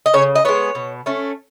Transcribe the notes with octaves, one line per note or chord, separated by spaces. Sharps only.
D#5
C#3 C#5
D#5
G#3 B3 C#5
B2
A3 C#4